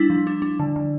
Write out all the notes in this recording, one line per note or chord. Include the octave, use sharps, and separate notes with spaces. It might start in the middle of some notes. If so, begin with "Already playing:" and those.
Already playing: G3 D4 E4
F3
D4
D4
D3
D3